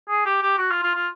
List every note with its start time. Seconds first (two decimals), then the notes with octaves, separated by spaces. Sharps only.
0.09 G#4
0.26 G4
0.43 G4
0.58 F#4
0.71 F4
0.83 F4
0.95 F4